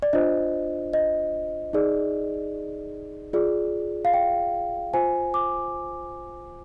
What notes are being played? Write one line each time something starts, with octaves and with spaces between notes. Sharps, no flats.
D5
D4 F4 C5 D#5
D#5
D#4 G#4 D5
F4 G#4 D5
F5
G5
F4 C5 G#5
D6